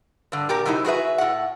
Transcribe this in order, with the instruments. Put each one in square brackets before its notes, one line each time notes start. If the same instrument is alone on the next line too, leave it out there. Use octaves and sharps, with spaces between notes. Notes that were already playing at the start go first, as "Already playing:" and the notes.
[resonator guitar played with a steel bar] G2 D3
A#2 G4 A#4 A#5
F#2 C3 F#3 D#4 E4
F#4 G#4 B4 E5
A2 F#5